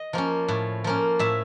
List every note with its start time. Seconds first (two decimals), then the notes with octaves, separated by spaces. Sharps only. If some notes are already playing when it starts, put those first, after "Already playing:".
Already playing: D#5
0.13 F3 A#3 C#4
0.48 A2
0.84 F3 A#3 C#4
1.19 A2 E5